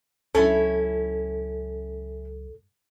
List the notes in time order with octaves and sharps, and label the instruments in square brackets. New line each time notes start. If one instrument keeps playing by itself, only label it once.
[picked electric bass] C#2 F#3 [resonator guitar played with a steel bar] C#4 E4 [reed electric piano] A4